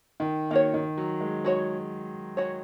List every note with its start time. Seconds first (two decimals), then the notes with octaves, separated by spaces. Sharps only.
0.20 D#3
0.51 D#3 A#3 F#4 C#5
0.74 D#3
0.97 F#3
1.20 G#3
1.45 G#3 F#4 C#5
2.37 G#3 F#4 C#5